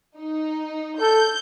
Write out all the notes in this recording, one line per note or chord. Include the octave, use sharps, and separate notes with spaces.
D#4
A4 G6